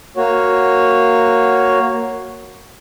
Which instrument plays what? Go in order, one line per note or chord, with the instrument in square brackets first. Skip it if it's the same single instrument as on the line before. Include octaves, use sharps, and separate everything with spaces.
[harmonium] A#3 F#4 C#5